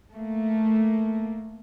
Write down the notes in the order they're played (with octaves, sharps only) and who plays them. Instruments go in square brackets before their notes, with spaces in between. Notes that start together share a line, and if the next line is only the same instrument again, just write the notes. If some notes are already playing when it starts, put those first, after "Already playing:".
[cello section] A3 A#3